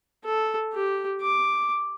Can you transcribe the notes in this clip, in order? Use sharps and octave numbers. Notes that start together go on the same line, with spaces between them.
A4
G4
D6